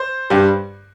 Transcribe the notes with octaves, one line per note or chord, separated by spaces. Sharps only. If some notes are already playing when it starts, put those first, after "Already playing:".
Already playing: C5
G2 G3